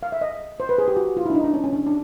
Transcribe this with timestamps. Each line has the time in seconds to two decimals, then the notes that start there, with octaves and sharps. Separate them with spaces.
0.03 F5
0.12 E5
0.21 D#5
0.60 C5
0.69 B4
0.78 G#4
0.88 G4
0.97 F#4
1.17 F4
1.26 E4
1.30 D4
1.35 D#4
1.44 D4
1.54 C#4
1.64 C#4
1.73 D4
1.86 D4